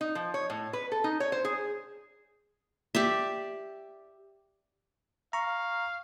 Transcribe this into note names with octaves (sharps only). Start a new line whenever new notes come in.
D#4
F3
C#5
A2
B4
A4
D#4
C#5
C5
G#4
G4 D5 E5
F5 A#5 C#6